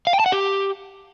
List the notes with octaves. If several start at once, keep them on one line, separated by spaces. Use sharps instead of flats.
F5
G5
A5
F#5
G4